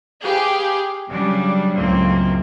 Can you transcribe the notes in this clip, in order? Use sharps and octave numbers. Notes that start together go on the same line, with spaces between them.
G4 G#4 B4 F5 G5
C#3 F#3 G3 D4
C#2 F#2 A2 F#3 A#3 C4